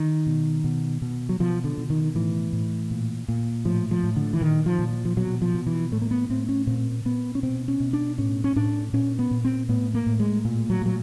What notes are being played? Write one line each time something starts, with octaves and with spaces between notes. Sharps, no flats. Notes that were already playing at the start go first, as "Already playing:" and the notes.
Already playing: D#3
B2
B2
B2
F#3
B2 F3
D3
B2
D#3
A2 E3
A2
A#2
A#2
A2 F3
F3
A2
D3
E3
A#2 D#3
F3
A#2
F3
B2 F#3
F3
B2
E3
A2 A3
A#3
B3
A2 C4
C#4
A#2 C4
A#2 B3
C#4
B2 C4
C#4
B2
D4
A2 C#4
C#4
A2 D4
A#2 C#4
B3
A#2
C4
A2 B3
A#3
A2
G#3
A#2
F#3
A#2 F#3